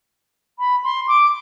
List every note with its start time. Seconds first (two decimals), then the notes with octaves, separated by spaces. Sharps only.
0.59 B5
0.84 C6
1.08 D6